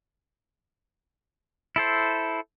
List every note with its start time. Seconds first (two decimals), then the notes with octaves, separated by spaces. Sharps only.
1.76 E4 A4 C5